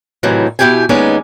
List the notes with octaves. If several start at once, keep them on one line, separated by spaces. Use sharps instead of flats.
A2 C3 D#3 E3 F#3
B2 G#3 E4 G4 G5 G#5
D#2 G#3 B3 C#4 D#4 D5